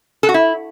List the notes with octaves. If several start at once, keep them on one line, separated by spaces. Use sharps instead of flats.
A4
F#4
E4